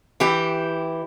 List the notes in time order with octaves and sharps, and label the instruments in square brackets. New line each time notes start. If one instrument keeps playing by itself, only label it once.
[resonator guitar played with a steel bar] E3 E4 G4